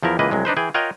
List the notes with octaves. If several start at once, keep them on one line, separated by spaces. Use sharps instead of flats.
E2 F3 E4 A#4
C#2 E3 A#3 B4 D#5
C2 F#3 G#3
D4 D#4 B4 C5
E3 G#4 G5
F4 A#4 C#5 D#5 F#5 G5